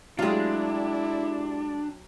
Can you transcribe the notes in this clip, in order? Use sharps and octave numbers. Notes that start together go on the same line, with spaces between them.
F#3 G#3 D4 E4 F4 G4